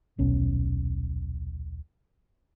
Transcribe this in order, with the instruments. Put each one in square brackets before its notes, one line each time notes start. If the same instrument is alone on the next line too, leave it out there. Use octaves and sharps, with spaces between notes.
[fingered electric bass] D#1 B1 C#4